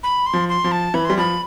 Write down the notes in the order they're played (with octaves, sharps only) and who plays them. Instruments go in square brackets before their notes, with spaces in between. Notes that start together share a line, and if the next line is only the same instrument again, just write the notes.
[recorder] B5
C6
[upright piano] F3
[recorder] C6
[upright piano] F3
[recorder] A5
[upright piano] E3 [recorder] B5
[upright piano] G3 [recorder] C6
[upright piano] F3 [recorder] B5